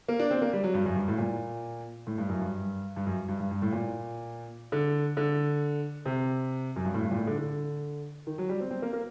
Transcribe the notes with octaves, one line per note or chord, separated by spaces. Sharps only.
A#3
D4
C4
A#3
G3
F#3
G2
F#2
G2
A2
A#2
A2
G2
F#2
G2
G2
F#2
G2
G2
G2
A2
A#2
D3
D3
C3
F#2
G2
A2
G2
A#2
A2
D3
D3
D#3
F#3
G3
C4
C4
A#3
A#3